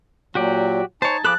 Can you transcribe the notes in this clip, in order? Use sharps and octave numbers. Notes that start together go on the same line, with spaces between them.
A#2 F#3 F#4 G4 D5
D#4 C5 C#5 G#5 A5
F3 G#4 A4 B5 D6 F#6